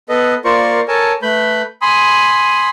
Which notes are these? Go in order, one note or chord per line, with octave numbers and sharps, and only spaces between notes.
B3 A4 B4 D#5
A#3 F4 A#4 C5 D5 C#6
A4 A#4 C#5 G#5 A5
A3 B4 B5 G6
G#5 B5 C6 D#6